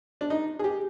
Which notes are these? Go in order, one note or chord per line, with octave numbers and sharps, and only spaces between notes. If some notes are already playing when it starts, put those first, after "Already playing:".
D4
D#4
G#4
G4